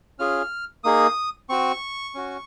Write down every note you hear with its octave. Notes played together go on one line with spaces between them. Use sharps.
C#4 F4 G#4 F6
A#3 D#4 G#4 D#6
C4 F#4 C#6
C#4 F#4